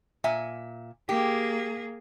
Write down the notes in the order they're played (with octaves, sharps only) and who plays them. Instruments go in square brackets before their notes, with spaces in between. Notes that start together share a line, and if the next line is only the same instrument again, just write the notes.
[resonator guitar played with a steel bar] A#2 E5 G#5
[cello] A#3 G#4 [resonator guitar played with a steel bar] G4